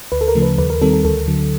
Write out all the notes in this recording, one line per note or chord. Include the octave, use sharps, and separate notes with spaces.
D2 B4
A4
A#4
C#3 F3 A3
B4
D#2 B4
A#4
D#3 G3 C4 A4
A4
D2 A4
D3 F#3